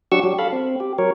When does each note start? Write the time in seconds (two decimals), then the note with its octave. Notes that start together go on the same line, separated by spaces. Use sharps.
0.12 F#3 D4 F#4 G4 C#6 E6
0.23 F#3 G4
0.39 A4 F5 B5
0.53 C4
0.80 G4
0.98 F#3 A#4 C#5